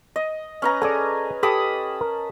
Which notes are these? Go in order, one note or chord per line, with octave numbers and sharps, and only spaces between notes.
D#5
C#4 B4 A#5
G#4 A4 D5 G#5
G4 A4 A5 B5 D#6
A#4